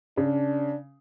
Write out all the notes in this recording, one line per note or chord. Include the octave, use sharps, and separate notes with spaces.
C#3 D4